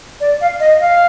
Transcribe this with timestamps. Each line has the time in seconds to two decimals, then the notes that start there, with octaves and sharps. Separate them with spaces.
0.20 D5
0.41 F5
0.60 D#5
0.80 F5